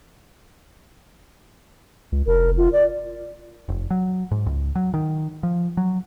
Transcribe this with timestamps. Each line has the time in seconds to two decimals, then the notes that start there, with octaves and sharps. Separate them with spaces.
2.12 C#2
2.27 F1 A#4
2.57 F4
2.73 D5
3.69 F1
3.90 F#3
4.31 G#2
4.46 C#2
4.75 F#3
4.94 D#3
5.43 F3
5.77 F#3